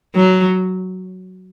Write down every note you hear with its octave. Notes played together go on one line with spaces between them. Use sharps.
F#3